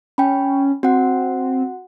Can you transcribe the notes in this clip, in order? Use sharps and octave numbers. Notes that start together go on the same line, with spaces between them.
C#4 G5 B5
C4 F#4 F#5